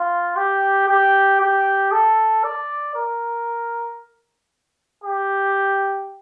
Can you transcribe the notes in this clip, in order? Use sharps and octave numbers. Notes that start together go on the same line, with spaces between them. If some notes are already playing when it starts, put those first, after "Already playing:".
Already playing: F4
G4
G4
G4
A4
D5
A#4
G4